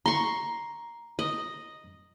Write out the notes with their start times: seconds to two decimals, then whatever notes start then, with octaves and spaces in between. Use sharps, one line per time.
0.06 A#5 C6 C#6
1.19 D#5